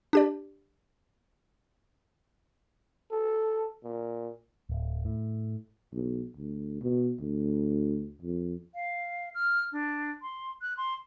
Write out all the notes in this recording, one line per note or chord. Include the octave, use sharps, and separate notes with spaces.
D4 G4 D5
A4
A#2
D1
A2
B1
D2
B2
D2
F2
F5
F6
D4
C6
F#6
C6